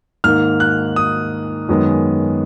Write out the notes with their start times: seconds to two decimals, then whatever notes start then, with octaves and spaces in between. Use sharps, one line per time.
0.24 G#2 D#3 A#3 F6
0.60 F#6
0.96 D#6
1.69 F#2 D#3 G#3 B3